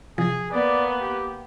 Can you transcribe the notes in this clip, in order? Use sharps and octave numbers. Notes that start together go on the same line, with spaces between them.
C3 F3 G#4
A#3 B3 D5
G4